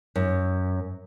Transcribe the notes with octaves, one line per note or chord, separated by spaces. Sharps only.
F#2